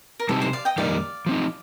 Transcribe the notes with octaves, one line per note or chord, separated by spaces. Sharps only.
A#4
C3 G3 C4 D#4 G4 A4
C5
D5 F5
D#5 G5
F2 D#3 G3 A#3 D#4 D5 F5
F3 C4 D#4